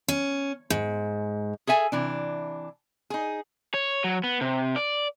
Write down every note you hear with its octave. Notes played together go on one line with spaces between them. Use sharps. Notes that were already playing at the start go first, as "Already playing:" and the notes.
C#4
G#2
G#4 A4 E5 G#5
C3 E3 D4
D#4 G#4
C#5
F#3
B3
C3
D5